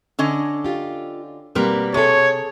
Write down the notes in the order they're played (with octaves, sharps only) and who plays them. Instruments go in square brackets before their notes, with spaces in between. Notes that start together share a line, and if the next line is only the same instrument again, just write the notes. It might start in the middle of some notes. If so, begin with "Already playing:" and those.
[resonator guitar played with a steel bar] D3 C#4 D#5
[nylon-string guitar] F4 G4
[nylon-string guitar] B2 G3 A#3 [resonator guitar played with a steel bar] C4 A#4 B4
[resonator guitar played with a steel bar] C3 [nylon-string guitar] G#4 A4 [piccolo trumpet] C#5